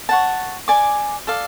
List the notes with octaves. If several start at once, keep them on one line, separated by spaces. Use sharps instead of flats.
C#5 F#5 A5
D5 G#5 D6
A4 D5 F5